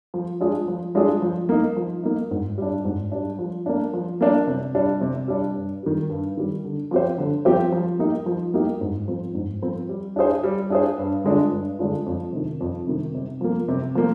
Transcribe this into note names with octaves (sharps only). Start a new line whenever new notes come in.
F3
G#3 D4 F4 G#4
F3
G#3 D4 F4 G#4
F3
A#3 D#4
F3
A#3 D#4
G#2
G3 D4
G#2
G3 D4
F3
A#3 D4
F3
A#3 D4
C3
G3 D4
C3
G3 D4
G2
D#3 G3
G2
D#3 G3
D3
F3 C4 G4 C5
D3
F3 C4 G4 C5
F3
A#3 D#4 G4
F3
A#3 D#4 G4
G#2
F3 C4
G#2
F3 C4
G3
D4 G#4 C5
G3
D4 G#4 C5
G2
D3 G#3 D4 F4
G2
D3 G#3 D4 F4
F2
C3 D#3
F2
C3 D#3
C3
F3 A#3
C3
F3 A#3